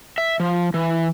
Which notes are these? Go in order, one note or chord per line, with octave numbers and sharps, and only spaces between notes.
E5
F3
E3